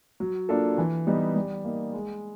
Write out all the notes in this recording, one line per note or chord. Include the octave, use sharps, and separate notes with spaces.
F#3
A#3 D4 F4 A4
E3
G3 B3 D#4
G3
A#3 D#4
G#3